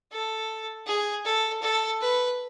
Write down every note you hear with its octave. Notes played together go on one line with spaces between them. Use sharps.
A4
G#4
A4
A4
B4